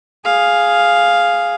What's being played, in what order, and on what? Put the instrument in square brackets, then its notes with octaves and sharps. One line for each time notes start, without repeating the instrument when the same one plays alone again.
[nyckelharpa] G#4 F5